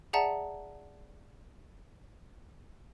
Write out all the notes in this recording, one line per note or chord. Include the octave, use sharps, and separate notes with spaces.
G#4 D5 E5 F#5 A5 A#5